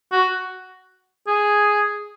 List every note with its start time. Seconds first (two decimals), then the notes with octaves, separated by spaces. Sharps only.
0.12 F#4
1.27 G#4